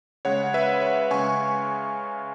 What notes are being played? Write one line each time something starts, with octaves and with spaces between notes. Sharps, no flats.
C#3 G#3 C#5 F#5
B4 E5
C#5
C#3 G#3 G#5 C#6